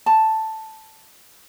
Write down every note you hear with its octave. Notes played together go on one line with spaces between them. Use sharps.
A5